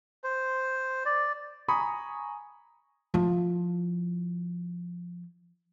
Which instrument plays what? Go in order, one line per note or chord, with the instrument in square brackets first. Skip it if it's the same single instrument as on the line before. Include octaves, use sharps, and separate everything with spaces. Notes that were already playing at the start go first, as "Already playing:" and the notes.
[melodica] C5
D5
[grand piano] G#5 A#5 B5 C#6 D#6
[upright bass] F3 E4